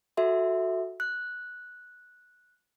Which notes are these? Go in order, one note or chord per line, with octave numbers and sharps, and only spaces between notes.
F#4 A4 E5 C6
F#6